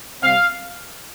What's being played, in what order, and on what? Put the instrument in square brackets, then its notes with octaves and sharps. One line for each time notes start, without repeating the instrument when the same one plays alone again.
[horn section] C3 G3 C4 F5